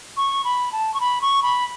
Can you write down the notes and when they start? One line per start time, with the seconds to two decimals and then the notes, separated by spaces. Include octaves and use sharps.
0.17 C#6
0.44 B5
0.72 A5
0.94 C#6
1.01 B5
1.22 C#6
1.43 B5